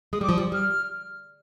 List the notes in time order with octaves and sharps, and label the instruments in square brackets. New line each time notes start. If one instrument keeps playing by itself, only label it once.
[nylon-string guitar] G#3 [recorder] D#6
[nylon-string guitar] G3 [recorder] D6
[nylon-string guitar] F3 [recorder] D#6
[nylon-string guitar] G3
[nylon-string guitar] G3 [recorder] F6